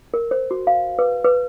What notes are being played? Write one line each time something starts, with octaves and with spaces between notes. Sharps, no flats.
A#4
C5
F#4
F5
B4
B4